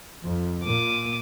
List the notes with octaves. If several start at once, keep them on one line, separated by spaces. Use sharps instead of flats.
F2
A#2 D6 D#7